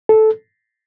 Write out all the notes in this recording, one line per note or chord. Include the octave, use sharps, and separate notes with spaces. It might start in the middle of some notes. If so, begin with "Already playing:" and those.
A4